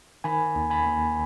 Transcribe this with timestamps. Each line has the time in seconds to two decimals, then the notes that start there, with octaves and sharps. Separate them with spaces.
0.24 D#3 G#5 B5
0.55 D#2
0.70 G#5 B5
0.86 D#2